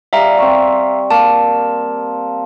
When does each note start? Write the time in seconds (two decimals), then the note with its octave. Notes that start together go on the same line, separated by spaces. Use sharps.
0.13 G3 E5 F5 A#5
0.38 C4 C#6
1.11 A#3 A5